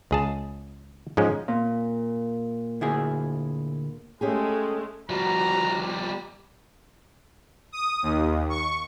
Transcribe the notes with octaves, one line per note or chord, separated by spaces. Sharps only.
C#2 G#4 A5
G#2 F3 G#3 C#4
A#2
D2 E4 G#4
G#3 A3 C#4 G4 G#4
F3 G3 F#4 A#5
D#6
D#2
C#6